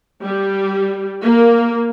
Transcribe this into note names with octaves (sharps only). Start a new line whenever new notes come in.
G3
A#3